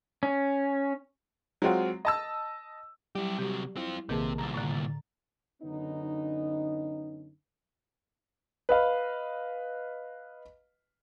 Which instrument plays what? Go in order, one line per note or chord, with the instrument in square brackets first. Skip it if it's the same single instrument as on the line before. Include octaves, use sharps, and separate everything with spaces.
[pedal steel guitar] C#4
[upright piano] F#3 G#3 C4 F4 F#4
D#5 A5 E6
[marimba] F#3 [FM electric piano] G3 [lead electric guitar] E4 G4
[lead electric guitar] C3 F#3 [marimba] G4
[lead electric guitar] C4 F4 [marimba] E4
[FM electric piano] A#1 A#3 A5 [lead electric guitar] C3 [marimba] D#3 G#4 B4
[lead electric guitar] C2 A#2 [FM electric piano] A#5 A6
[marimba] A2 D3
[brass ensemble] F#2 D3 B3 C#4 D#4
[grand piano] B4 D#5 F5